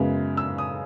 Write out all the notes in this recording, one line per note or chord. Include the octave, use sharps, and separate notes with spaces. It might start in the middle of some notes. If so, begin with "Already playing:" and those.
Already playing: F#2 C#3 G#3 B3
E6
D#6